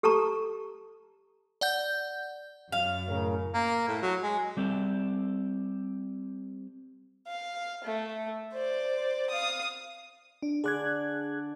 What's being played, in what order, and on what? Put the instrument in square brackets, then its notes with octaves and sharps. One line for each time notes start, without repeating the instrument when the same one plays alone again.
[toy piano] G4 A4 A5 A#5 C#6
[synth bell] D5 F#5 G6
[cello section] F#2 [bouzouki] F5
[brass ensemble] A2 C#3 A#4
[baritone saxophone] A#3
A2
F#3
G#3
[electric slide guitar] G3 C4 A4
[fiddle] F5
A3
C5 D5
F5 D#6
[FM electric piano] D4
[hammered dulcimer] D3 D5 D6 [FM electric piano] G#4 F#6 G#6